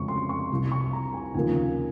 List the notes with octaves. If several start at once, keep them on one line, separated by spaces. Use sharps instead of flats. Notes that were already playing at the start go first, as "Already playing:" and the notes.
Already playing: F2 C#3 G#3 C#6
C6
C#6
C2 C3 G3
C#6
A#5
G#5
D#2 C#3 F3 A#3 G#5